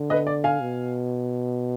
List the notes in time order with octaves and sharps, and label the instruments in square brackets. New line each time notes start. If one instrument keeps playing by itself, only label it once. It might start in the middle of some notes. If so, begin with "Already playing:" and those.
Already playing: [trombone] D3
[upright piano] B4 D#5
D5
F5 G#5
[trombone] B2